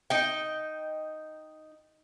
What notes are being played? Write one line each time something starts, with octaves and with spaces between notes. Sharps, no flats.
D#4 G5